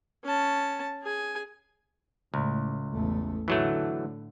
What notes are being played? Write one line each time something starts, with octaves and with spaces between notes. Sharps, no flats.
C#4 A5
G#4 G#5
C#2 A2
A1 E2 A3
A2 D3 E3 F#3 A3